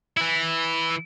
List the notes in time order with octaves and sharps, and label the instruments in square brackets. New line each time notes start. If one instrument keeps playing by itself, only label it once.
[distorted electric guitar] E3 E4